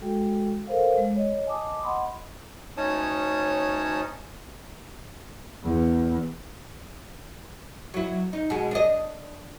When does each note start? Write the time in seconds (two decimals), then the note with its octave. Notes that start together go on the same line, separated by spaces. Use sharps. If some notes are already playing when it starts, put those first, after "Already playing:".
0.01 G#3 F#4 A4 G5
0.67 A4 A#4 C5 F5
0.97 G#3
1.15 C#5 D#5
1.46 D#5 G#5 A5 D6 D#6
1.83 D#5 F#5 B5 C6
2.77 D2 C#4 D#4 C#5 A5 D#6
5.65 E2
7.94 F#3 E4
8.33 D#4
8.50 B2 G#3
8.71 D4 D#5